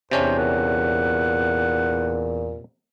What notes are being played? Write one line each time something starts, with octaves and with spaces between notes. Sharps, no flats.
E2 C3 C#4 D4 C5
A#2 F#5